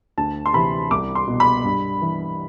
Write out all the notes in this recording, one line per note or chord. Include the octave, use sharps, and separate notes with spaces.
D2 A5
C6
C3 E3 B5
C2 D6
C6
B2
B5
G2
E3